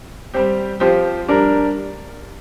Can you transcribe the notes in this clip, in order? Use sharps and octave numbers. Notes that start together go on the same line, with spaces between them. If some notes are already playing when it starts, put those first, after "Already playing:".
G3 C4 G4
F3 C4 G4 C5
G3 D4 A#4